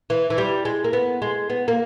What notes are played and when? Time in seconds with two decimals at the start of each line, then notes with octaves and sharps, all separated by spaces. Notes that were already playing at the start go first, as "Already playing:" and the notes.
0.10 E3
0.30 E3
0.38 G3
0.65 G#3
0.84 A#3
0.93 B3
1.22 G#3
1.50 B3
1.68 A#3